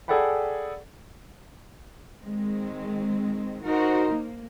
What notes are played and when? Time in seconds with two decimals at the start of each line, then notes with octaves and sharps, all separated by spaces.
0.08 G#4 A4 D5 F#5 G5 B5
2.22 D#3 G#3 C4
3.64 D#4 F#4 A#4 C5
4.11 A#3